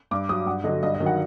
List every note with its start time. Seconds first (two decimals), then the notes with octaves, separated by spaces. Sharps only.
0.11 G2 D6
0.29 F#3 D#6
0.46 G2 F#5
0.64 D3 F#3 D#5
0.83 G2 D#5
0.94 D#5
1.00 D#3 F#3
1.06 F#5